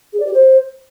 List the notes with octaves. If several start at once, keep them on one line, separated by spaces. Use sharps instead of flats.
G#4
D5
G4
C5